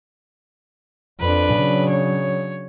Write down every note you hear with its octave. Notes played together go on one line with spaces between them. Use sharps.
F2 D4 B4
C#3 F#3
C#5